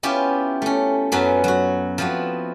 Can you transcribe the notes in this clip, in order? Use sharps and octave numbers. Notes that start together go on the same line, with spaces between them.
B3 C#4 E4 F4 G4
A3 C#4
F#2 F#3 B3 C#4
F#3 F#4
F3 B3 C4 E4 F#4